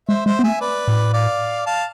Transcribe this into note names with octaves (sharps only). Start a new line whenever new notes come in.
G#3 C5 E5
G#3 C5 E5
B3
A3 E5 G#5
B4 D5
A2
D5 F5
F5 A5